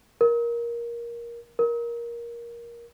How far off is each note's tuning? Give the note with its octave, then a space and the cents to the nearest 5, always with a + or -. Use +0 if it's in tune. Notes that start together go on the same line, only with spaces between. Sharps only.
A#4 +15
A#4 +15